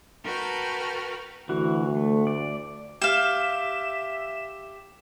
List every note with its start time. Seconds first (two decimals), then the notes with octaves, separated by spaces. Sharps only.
0.23 F#4 A#4 B4 G5 A5 F6
1.49 D2 E3 F#4
1.96 A3
2.27 D5
3.01 G4 E5 F5 E7